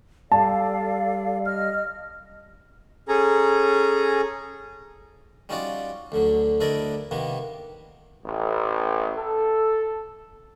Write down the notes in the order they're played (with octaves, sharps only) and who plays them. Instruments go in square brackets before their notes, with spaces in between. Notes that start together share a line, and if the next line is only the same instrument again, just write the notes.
[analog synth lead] G3 [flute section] A4 D5 F5 [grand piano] A5
[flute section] D#5 F6
[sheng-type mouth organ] C#4 G#4 A4 G#5 A#5
[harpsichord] G3 C#4 D#4 F4 F#4 D5
D2 D3 F#3
D2 D4 E4 A#4 D5 D#5
C3 D#3 A#3 B3
[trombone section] A1
A4